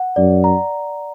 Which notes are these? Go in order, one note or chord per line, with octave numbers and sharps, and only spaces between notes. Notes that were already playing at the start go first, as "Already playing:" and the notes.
Already playing: F#5
F#2 D5
A#5